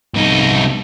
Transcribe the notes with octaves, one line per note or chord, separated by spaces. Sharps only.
C2 D#4